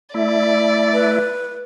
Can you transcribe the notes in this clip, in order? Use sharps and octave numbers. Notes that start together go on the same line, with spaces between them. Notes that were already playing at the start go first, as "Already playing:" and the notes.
A3 E4 D5
B4